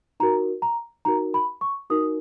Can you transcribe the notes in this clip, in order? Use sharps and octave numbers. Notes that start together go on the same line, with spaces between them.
D#4 F#4 A#4 A#5
A#5
D#4 F#4 A#4 A#5
B5
C#6
D#4 F#4 A#4 D#6